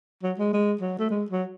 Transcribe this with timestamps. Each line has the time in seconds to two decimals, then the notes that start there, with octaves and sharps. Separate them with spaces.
0.23 F#3
0.39 G#3
0.53 G#3
0.81 F#3
0.99 A3
1.10 G#3
1.31 F#3